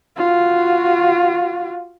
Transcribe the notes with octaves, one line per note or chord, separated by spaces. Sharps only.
F4 F#4